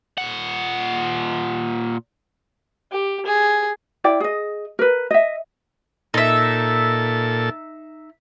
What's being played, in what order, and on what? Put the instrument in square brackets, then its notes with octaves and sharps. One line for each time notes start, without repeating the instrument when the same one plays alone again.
[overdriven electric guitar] A#2 F#5
[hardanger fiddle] G4
G#4
[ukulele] E4 D5 G5
G#4 D#5
A#4 B4
D#5 E5
[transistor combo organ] A#2 A4 [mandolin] D#4 E5